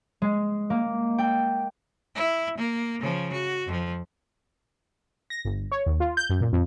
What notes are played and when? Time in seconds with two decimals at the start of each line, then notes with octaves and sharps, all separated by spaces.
0.22 G#3
0.70 A#3
1.18 G5
2.15 E4
2.58 A#3
3.00 C#3 F3
3.33 F#4
3.67 F2 F3
5.30 A#6
5.45 G1
5.72 C#5
5.86 D#2
6.00 F4
6.17 G6
6.30 F#2
6.41 A#2
6.53 F2